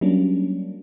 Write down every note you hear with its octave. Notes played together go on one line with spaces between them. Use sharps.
F#3 G3 A#3 C#4 D4